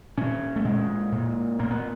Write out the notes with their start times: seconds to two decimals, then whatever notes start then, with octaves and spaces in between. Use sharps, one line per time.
0.18 A#2 C#4
0.56 A3
0.65 A#2 G#3
1.12 A#2
1.59 A#2 A#3
1.71 B3